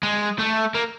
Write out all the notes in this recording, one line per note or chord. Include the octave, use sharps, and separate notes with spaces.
G#3
A3
A#3